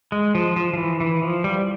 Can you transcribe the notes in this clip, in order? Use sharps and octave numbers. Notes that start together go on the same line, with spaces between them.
G#3
F3
F3
F3
E3
E3
F3
G3